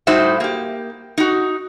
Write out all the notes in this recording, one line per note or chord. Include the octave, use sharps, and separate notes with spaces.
A2 G3 D#4 F#4 C5 E5
A#3 G4
D#4 F#4